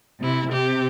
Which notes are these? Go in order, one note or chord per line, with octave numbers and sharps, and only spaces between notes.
C3 E4
C3 G4